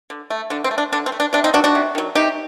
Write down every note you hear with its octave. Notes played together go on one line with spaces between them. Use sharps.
D3
A3
D3 D4
C4
A3
D4
D3 D4
C4
A3
D4
C3 D4
C4 D#4
D#3 F#3 D4 F#4
D4 F#4
C3
D#3 F#3
C3 D#4 G4